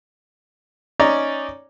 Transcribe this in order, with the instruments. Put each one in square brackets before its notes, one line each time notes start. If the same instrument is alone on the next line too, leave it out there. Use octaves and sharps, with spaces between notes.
[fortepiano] C#4 D#4 D5 A#5